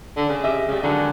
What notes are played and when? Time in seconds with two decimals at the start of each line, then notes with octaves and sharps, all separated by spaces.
0.16 D3
0.29 C#3
0.44 G4 D#5 E5
0.68 C#3 G3 G#3
0.83 D3 D#3 F#3 G#3